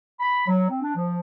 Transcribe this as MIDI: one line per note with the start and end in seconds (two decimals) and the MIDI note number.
0.20 0.45 83
0.48 0.67 54
0.69 0.80 60
0.82 0.91 62
0.95 1.20 53